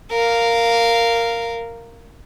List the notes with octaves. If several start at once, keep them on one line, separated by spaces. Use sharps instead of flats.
A#4 F5